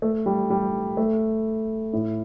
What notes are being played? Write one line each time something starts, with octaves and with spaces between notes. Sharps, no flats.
A3
G3
G3
A3
A2